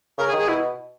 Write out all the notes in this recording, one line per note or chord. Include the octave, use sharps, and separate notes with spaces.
C#3 A#4
G#4
D#3
G#4
B2 E4